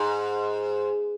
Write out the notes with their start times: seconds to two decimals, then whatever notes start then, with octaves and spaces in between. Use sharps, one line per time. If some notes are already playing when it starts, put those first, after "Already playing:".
Already playing: G#2